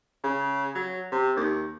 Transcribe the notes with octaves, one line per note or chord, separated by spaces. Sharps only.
C#3
F#3
C3
D#2